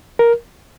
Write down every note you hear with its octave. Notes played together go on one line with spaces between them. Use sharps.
A#4